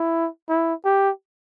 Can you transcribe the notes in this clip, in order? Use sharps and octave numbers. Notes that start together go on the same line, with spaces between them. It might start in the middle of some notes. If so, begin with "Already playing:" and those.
Already playing: E4
E4
G4